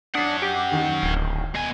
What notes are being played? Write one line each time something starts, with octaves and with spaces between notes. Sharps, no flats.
C#4 D4 F#5 D#6 B6 C7
G4
D#2 D#3
D1
B2 G#5